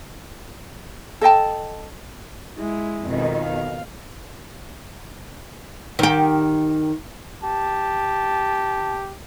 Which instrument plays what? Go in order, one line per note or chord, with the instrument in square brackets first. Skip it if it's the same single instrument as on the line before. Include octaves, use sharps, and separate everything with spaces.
[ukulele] A4 D#5 G5 A5
[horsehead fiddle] G#3 E4
[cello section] F2 B2 D#3
[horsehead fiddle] F5
[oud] D#3 G4
[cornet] G4 [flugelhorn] A5